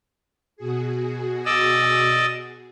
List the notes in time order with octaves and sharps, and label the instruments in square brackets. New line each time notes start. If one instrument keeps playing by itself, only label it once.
[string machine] B2 F#4 G#4
[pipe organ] D5 D#5 E6